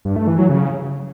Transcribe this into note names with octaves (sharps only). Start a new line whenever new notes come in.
G2
A3
E3
F#3
C#3